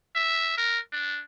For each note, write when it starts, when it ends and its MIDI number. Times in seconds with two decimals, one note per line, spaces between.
0.15 0.57 76
0.57 0.79 70
0.92 1.22 62